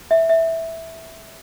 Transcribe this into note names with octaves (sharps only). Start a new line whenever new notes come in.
E5
E5